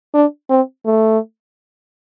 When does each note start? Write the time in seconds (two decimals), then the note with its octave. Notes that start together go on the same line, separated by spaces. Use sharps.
0.14 D4
0.50 C4
0.86 A3